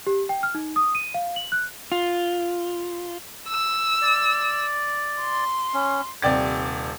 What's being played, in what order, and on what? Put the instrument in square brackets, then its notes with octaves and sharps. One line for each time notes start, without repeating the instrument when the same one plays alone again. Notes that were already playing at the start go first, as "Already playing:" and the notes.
[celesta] G4
G5
F6
D#4
D#6
D#7
F5
F#7
F#6
[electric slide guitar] F4
[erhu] E6
[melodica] D5
[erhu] C6
[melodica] C#4
[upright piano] D#1 C3 D5 G5 A6